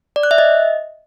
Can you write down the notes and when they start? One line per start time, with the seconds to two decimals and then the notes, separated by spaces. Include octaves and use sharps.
0.16 D5
0.23 F#6
0.31 E5
0.38 D#5